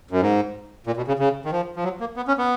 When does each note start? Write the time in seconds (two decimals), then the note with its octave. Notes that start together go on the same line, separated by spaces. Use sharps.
0.11 F#2
0.21 G#2
0.87 A#2
0.97 B2
1.08 C#3
1.19 C#3
1.45 D#3
1.52 F3
1.76 F3
1.84 F#3
2.00 A#3
2.17 B3
2.28 C#4
2.38 B3